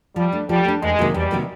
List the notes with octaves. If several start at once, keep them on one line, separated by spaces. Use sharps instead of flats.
F3 G3
A3 D4
F3 G3
A3 D4
E2 G#3
C3 D#3 F#3 A#3
E2 G3
C3 D#3 F#3 A#3